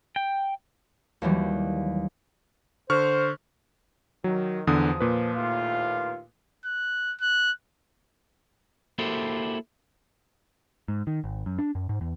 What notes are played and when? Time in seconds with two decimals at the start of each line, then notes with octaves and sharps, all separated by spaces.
0.16 G5
1.22 D#2 E3 F#3 G3
2.90 D3 C5 C#6 F6
4.24 D#3 F#3
4.67 E2 D3 F3 D#6
5.00 A#2 B4
5.34 D#2 A2 F4
6.65 F#6
7.21 F#6
8.99 A#3 E4 F#4 G4 A4 C5
10.88 G#2
11.07 D#3
11.24 G#1
11.46 F#2
11.59 D4
11.75 F#2
11.89 G#2
12.01 E2